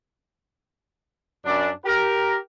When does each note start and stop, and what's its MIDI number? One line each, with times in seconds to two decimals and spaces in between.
1.45 1.71 42
1.45 1.71 62
1.85 2.37 67
1.85 2.37 70